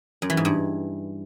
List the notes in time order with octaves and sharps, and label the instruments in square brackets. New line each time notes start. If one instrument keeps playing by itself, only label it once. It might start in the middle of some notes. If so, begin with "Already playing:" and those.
[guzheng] F#2
E3
G#2
G2